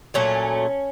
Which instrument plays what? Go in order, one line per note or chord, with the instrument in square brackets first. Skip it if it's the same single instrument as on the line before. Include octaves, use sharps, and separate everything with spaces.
[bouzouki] A#2 F#3 A3 C#4